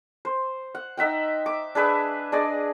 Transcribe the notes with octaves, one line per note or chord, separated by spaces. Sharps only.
C5
F#5
D#4 E5 F#5 G5
D6
D4 G#4 B4 E5
D4 G#4 D5 D#5